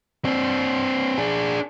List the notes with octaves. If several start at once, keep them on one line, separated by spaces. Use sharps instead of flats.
C4 D4
D4 G#4